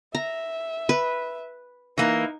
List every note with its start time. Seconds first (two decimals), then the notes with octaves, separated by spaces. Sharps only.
0.15 E5 A#5
0.89 B4
1.98 E3 A#3 D#4